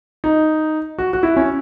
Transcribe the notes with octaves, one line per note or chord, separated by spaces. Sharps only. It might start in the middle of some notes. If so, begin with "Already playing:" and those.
D#4
F#4
F#4
E4
C#4